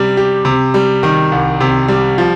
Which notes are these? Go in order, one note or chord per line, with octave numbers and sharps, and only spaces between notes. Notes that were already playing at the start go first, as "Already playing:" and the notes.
Already playing: C3 G3
G4
C3
G3
D#3
C2
C3
G3
F3